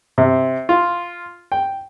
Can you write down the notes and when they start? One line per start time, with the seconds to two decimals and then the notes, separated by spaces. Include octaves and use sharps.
0.18 C3
0.69 F4
1.52 G5